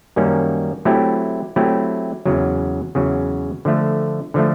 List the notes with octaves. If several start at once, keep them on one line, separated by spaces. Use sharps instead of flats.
F#2 D#3 G3 A#3 C#4
F#3 A3 C4 E4 G4
F#3 A3 C4 E4 G4
E2 C#3 F#3
E2 C#3 F#3
D3 F3 A3
D3 F3 A3